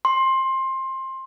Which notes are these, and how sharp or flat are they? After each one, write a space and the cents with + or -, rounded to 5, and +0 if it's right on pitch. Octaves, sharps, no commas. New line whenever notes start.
C6 +20